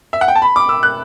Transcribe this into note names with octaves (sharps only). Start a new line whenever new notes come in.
E5
F#5
G5
A5
B5
D6
E6
F#6